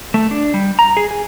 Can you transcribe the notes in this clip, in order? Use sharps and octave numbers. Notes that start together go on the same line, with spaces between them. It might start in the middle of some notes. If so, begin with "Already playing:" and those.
A3
D4
G3
A#5
G#4
G#4